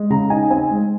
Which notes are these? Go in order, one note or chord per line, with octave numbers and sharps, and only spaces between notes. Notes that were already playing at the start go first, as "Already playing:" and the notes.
Already playing: G#3
C#3 A#5
D#4 G#5
C4 G#5
G#3